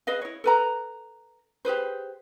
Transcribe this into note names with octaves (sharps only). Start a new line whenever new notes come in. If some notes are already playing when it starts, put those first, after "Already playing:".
G#4 B4 D#5 F5
E4 C#5
A4 B4 A#5
G4 G#4 B4 C5